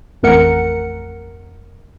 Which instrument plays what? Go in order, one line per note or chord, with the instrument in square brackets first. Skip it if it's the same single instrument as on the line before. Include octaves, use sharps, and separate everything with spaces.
[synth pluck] A1 F2 A3 A#4 F#5 C#7